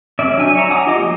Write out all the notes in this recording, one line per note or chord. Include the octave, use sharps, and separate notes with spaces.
C#4 D5 E5
F#3 D4 D#4 G#5
C#5 E5 A#5
F#5 G#5 A#5 D6 D#6
F4 G4 D#5 D6 D#6
F3 F#3 A#3